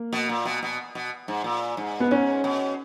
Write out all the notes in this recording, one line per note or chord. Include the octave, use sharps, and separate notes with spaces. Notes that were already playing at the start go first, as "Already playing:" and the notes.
Already playing: A#3
B2
A#2
B2
B2
B2
G#2
A#2
G#2
B3
G#2 C#4
B2